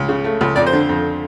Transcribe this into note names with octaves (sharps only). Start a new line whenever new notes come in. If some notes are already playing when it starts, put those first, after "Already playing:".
Already playing: C#2
C#3
A3
C#2
F2 D5
C5
D3
F2